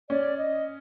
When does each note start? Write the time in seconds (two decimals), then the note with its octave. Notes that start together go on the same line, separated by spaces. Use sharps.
0.09 C#4 D5
0.37 D#5